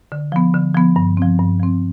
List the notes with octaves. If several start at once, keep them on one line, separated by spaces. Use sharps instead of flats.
D3
F3 B3
D3
F3 B3
G2
F3 C4
G2
F3 C4